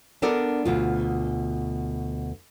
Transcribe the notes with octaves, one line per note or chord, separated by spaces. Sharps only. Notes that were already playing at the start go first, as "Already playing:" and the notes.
B3 D4 A4 A#4 D5
D2 B2 F4